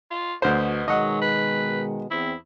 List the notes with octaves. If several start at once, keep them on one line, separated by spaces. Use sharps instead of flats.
F4
D2 B2 C5
B2 D#3 F#3 G#3 D#5 F#5
B4
E2 C4 E4 C5